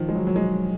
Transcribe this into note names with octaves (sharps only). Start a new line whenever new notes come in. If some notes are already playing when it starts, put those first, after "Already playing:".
Already playing: D#3 F3
G#3
F#3
F#3
G#3